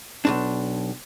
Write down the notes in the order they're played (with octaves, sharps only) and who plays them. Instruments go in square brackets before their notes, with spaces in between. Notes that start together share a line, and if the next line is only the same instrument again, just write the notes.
[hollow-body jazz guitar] B1 F#2 D4